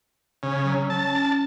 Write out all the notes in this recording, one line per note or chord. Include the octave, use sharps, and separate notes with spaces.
C#3
F#3
C#4 A5